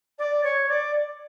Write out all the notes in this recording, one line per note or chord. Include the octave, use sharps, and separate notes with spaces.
D5
C#5
D5